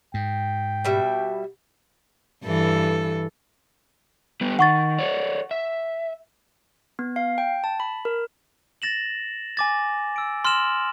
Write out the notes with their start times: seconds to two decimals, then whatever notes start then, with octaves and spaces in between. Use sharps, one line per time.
0.14 G#2 G5
0.84 B2 G3 E5
2.44 G2 E3 A4
4.41 G3 B3 G4
4.59 D#3 F#5 C#6 A6
4.99 A4 C#5 D5
5.51 E5
6.99 B3
7.16 F5
7.38 G5
7.64 A5
7.80 B5
8.05 A#4
8.82 A6 A#6 E7 F#7
9.57 G#5 D6 A6
10.16 E6 D7
10.45 C6 F6 A#6 E7 F#7